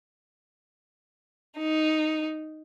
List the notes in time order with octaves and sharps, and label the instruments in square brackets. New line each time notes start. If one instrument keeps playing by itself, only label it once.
[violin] D#4